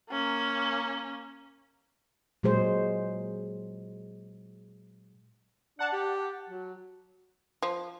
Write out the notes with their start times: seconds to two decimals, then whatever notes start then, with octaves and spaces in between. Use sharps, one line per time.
0.11 A#3 C#4
2.43 A#2 F#3 G#3 G#4 C5
5.79 D4 F#5 A5
5.92 G4
6.49 F#3
7.62 F3